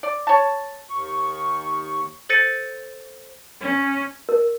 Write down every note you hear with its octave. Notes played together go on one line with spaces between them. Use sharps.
D5
C#5 A5
D#2 C#6
A4 C5 A6 A#6 C#7 D#7
C#4
A#4